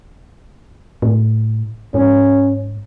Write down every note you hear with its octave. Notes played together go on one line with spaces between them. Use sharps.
A2
G#2 C#4